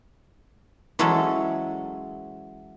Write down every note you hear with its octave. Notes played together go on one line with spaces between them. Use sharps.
E3 F#3 G#3 C#4 A4